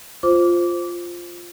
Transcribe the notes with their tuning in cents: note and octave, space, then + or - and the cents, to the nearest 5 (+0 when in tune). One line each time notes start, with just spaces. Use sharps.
F4 +0 C5 +0 D6 -20